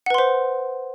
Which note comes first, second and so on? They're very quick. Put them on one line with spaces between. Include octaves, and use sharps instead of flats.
F#5 B4 C6 C5